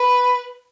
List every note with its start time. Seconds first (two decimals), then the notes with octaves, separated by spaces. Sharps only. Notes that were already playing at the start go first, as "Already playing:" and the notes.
Already playing: B4